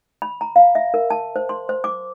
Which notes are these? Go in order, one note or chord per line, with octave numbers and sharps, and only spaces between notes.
B5
A#5
F5
E5
A#4
A5
C5
C6
C5
D6